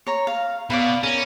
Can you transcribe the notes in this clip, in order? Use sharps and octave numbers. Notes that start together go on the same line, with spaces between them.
C#5 A#5
F5
B2 D5 F5 B5
C#4 A#4